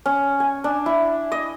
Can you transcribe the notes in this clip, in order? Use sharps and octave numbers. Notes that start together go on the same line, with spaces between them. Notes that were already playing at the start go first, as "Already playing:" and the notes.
C#4
G#5
D4
E4
D#5